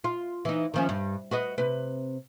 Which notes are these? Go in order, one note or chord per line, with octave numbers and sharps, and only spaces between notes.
F4
E3 D#4
D#3 F3 C#4
G2
F#4 B4 D#5
C3 B4